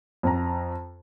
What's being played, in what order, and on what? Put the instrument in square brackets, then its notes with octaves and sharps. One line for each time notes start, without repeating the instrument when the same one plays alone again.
[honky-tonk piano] F2 A#5